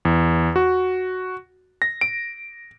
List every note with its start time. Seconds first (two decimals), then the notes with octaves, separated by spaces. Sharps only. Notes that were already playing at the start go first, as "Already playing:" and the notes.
0.05 E2
0.56 F#4
1.82 A#6
2.01 D7